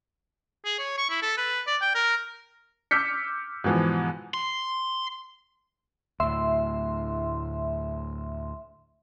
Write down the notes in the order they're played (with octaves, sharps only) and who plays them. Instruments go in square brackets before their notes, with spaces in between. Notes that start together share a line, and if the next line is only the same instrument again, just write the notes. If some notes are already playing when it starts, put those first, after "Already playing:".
[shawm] G#4
C#5
C#6
E4
A4
B4
D5
G5
A#4
[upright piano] D6 E6 F6 G6 B6 C#7
G#2 B2 E3 F3
[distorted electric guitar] C6
[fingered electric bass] D2 A2 [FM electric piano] E5 C6